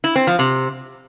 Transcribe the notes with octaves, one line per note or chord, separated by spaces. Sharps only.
E4
C4
F3
C3